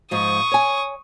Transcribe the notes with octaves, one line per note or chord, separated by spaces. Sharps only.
G#2 F3 C#6 D#6
C#5 G#5